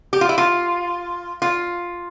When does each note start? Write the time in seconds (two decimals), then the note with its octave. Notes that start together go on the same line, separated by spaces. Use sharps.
0.13 G4
0.21 F4
0.29 E4
0.38 F4
1.42 F4